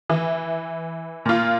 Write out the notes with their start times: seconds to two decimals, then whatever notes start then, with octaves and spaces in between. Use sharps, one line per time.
0.10 E3
1.26 A#2 F4